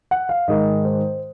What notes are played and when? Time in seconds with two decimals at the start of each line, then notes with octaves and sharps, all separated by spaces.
0.11 F#5
0.29 F5
0.48 G#2 D#3 G#3 D#5
0.85 C5